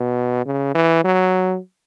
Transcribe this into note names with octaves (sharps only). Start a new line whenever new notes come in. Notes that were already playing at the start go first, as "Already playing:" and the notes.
Already playing: B2
C#3
E3
F#3